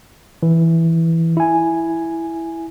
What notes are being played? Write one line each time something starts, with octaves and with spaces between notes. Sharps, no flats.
E3
E4 G#5